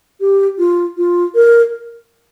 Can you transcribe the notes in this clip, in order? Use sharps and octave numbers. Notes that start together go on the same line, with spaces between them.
G4
F4
F4
A#4